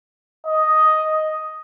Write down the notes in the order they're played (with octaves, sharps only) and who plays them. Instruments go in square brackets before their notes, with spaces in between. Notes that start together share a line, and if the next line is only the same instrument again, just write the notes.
[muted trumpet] D#5